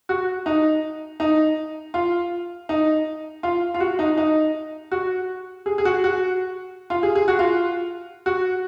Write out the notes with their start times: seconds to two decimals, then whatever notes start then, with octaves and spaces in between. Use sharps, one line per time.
0.09 F#4
0.46 D#4
1.20 D#4
1.94 F4
2.69 D#4
3.43 F4
3.74 F4
3.80 F#4
3.99 D#4
4.18 D#4
4.92 F#4
5.66 G#4
5.78 G#4
5.85 F#4
6.04 F#4
6.90 F4
7.03 G#4
7.15 G#4
7.28 F#4
7.39 F4
8.26 F#4